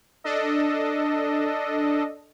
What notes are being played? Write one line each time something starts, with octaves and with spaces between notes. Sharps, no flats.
D4 A4 D#5